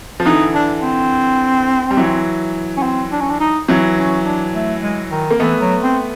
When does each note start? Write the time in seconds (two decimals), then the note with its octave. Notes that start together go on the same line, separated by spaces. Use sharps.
0.20 F3
0.25 D3 E3 D#4
0.55 D4
0.82 C4
1.91 G3
1.97 E3 F#3
2.77 C#4
2.83 C4
3.12 D4
3.20 C#4
3.30 D4
3.40 D#4
3.68 E3 F#3
3.97 C#4
4.25 D4
4.54 A3
4.82 G#3
5.11 D#3
5.31 A#3
5.40 E3 A3 B3
5.61 F#3
5.82 C4